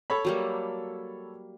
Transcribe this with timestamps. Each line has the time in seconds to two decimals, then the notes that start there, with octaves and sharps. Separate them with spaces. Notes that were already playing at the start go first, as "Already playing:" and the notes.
0.10 A4 C#5 B5
0.25 F#3 G3 A#3